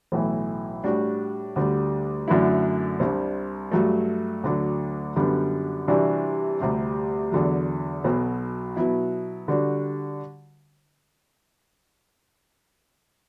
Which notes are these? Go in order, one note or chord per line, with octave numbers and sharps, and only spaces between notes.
B1 A2 E3
A2 G3 D4 F#4
D2 D3 G3
F#2 D3 F#3 A3 E4
C2 C3 G3 D4
G2 F#3 A3
D2 D3 F#3
F#2 D3 G3 B3 D4
C3 E3 G3 D4 F#4
D2 C3 G3
E2 D3 F#3
B1 B2 F#3
B2 F#3 B3 E4
D3 G3 D4 F#4